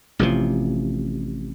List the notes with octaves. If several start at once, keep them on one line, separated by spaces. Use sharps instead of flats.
A1 C3 D#3 F3